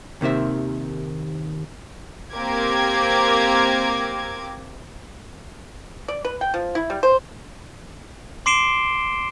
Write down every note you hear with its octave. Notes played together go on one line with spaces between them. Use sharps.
D#2 C3 D#3 C5 E5
A#3 C4 G4 A#4 D6 G#6
D5
B4
G5
F3
E4
G3
C5
C6 D6 C7 D7 E7 G7